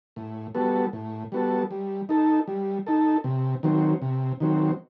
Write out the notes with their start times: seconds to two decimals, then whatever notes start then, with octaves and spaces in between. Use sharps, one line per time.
0.16 A2
0.55 G3 B3 F#4 A4
0.93 A2
1.32 G3 B3 F#4 A4
1.71 G3
2.09 D#4 A4
2.48 G3
2.87 D#4 A4
3.24 C3
3.63 D#3 F#3 C4
4.02 C3
4.40 D#3 F#3 C4